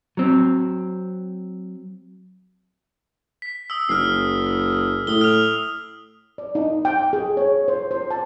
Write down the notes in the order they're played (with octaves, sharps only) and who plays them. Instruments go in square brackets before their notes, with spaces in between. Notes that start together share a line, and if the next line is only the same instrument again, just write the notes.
[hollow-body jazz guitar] F#3 C4
[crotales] B6
D#6 E6
[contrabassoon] F#1 [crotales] F6 C7
[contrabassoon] A2 [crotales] D#6 G7
[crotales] F6 F7
[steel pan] D5
D#4
G5
G#4
C#5
C5
C5
A5